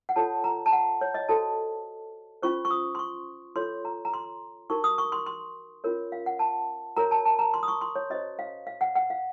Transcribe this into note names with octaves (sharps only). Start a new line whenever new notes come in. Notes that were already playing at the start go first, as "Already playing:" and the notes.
F#5
F4 A4 C#5 A5
A#5
A5
F#5
C#5
D#5
F#4 A4 C5 A5
C#4 F4 C5 C#6
C#6
D#6
C6
C#6
F4 A4 C#5 C6
A#5
A#5
C6
D#4 F#4 A#4 C#6
D#6
C#6
C6
C6
C#4 F4 A#4 C#5
F5
F#5
A5
F#4 A#4 C#5 A#5
A5
A5
A#5
C6
D#6
C#6
C6
C#5
C#4 F#4 C5 D#5
F5
F5
F#5
F#5
F5